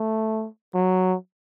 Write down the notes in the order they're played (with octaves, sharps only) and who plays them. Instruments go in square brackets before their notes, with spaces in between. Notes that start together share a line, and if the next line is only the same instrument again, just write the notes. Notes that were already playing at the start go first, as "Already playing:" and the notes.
Already playing: [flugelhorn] A3
F#3